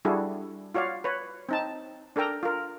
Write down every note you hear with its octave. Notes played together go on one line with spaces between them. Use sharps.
G3 D4 E4 F#4 G#4 A4
F4 F#4 C#5 D5 F5
B4 C#5
C4 D#4 A5
D4 A4 A#4 G5 A#5
F4 A#4